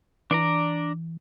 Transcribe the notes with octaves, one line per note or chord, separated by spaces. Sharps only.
E3 D4 D5 A#5